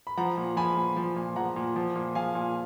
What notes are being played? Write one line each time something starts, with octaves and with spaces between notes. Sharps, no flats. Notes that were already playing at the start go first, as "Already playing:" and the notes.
B5
F3 F#5 A#5
A#2
F3 G#5 B5
A#2
F3
A#2
F3 F#5 A#5
A#2
F3
A#2
F3 F5 G#5
A#2